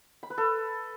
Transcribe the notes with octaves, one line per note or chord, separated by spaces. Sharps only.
B5
B4
A4